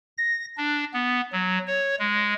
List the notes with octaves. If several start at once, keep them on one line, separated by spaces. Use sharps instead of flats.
A#6
D4
B3
F#3
C#5
G#3